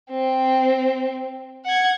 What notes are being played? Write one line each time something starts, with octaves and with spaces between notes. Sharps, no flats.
C4
F#5 G#6